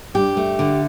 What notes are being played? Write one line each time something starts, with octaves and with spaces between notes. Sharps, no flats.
G2 G4
A3
D3